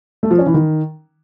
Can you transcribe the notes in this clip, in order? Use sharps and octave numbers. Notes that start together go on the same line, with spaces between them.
A3
F3
C#4
E3
D#3